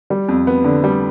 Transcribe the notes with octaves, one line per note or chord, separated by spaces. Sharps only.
G3
F2
B3
D3
G3